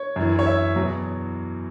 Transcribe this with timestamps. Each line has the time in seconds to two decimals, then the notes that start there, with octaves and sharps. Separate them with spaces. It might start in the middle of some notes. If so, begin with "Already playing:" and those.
Already playing: C#5
0.16 F#2 E3
0.39 C#5
0.46 E5
0.76 E2 B2 F#3